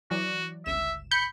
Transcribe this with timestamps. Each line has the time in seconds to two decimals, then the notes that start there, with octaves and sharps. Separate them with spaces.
0.11 E3 F#3 F#4 D5
0.66 G1 C#2 E5 E7
1.11 B5 G6 C#7